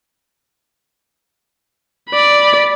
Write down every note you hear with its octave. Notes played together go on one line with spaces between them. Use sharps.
D5 B5